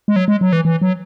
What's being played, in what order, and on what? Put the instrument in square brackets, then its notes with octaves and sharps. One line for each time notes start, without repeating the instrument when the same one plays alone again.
[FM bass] G#3
F#3
G#3
F#3
E3
E3
F#3